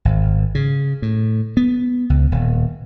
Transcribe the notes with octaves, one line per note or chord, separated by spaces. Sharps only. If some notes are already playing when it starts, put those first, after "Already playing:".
G#1
C#3
A2
B3
C#2
D#1